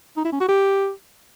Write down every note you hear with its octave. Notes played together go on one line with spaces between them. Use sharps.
D#4
E4
C#4
F#4
G4